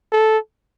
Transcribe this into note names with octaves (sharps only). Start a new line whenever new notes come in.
A4